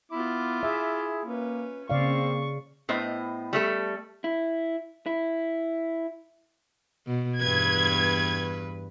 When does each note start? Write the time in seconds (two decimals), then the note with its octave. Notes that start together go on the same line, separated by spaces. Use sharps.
0.12 B3 E4 F4 D6
0.63 G#4 E5
1.25 A#3 C#4 B4
1.90 C#3 A#3 C4 D5 F5 C#6
2.89 A2 B3 C5 D#5
3.53 G3 A3 A4
4.24 E4
5.06 E4
7.07 B2
7.42 E2 G2 B4 G#6